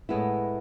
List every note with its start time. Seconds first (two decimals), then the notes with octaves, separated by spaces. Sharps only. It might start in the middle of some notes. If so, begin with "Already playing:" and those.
0.09 A2 G#3 B3 E4